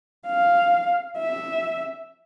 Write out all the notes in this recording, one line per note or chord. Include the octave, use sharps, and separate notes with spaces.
F5
E5